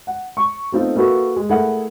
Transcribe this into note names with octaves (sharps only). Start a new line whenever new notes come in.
F#5
C#6
A3 B3 C4 D#4 F4 A4
A#3 E4 F#4 A4 B4
G#3
A3 E4 G#4 A#4 F#5